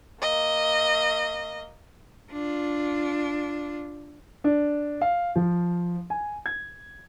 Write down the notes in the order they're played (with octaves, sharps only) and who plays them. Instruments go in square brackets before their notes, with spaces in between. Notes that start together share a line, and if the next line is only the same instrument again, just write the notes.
[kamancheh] A#3 D#5
[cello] D4 F4
[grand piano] D4
F5
F3
G#5
G#6